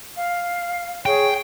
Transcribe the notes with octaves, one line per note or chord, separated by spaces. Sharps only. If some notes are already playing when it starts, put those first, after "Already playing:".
F5
G#4 C#5 G5